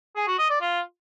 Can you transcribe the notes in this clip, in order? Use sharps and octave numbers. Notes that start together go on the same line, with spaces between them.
G#4
F#4
D#5
D5
F4